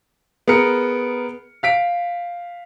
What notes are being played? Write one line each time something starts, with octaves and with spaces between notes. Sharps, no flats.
B3 G#4 A#4 C#7
F5 B6 D7